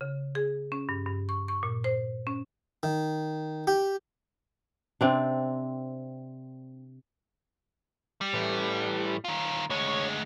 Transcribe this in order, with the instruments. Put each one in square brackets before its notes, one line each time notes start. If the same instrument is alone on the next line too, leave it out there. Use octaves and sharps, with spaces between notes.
[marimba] C#3
G#4
C#4
G2
G2
C#6
C#6
A#2
C5
C#4
[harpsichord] D#3
G4
[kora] C3 C4 D4
[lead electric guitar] G3
[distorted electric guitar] A2 E3
[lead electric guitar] D#3 F4
[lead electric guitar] D2 G#3 [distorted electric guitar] C#5